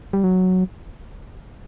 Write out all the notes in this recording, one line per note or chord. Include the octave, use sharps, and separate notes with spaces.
G3
F#3